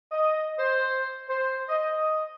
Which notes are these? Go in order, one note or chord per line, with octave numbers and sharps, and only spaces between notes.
D#5
C5
C5
D#5